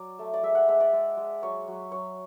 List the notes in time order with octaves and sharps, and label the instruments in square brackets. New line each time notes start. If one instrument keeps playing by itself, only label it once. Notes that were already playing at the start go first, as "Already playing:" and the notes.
Already playing: [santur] F#3 D5
A3
D5
G#3 E5
F#5
G#3 E5
D5
G#3
G#3
F#3 C#5
F#3
F#3 C#5